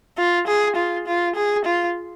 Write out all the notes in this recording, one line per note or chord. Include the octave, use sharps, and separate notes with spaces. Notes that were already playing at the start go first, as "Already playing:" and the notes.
F4
G#4
F4
F4
G#4
F4